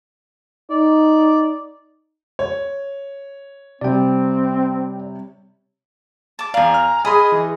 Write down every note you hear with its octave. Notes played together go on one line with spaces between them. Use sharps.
D#4 D5
C#5
C3 G3 C4 D5 G5
A5 D6
E2 D5 F5 G#5 A#5
F6
G#4 D#5 G#5 B5 C6 D#6
E3